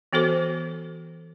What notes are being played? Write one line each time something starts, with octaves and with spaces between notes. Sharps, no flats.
E3 B3 F#4 A4 C5